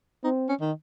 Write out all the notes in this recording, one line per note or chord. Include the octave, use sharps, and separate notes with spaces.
C4 D#4
C#4
D#3